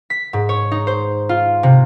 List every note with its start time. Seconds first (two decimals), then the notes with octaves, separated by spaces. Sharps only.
0.10 B6
0.33 G#2
0.49 C#5
0.71 D#4
0.87 C5
1.29 F4
1.63 C3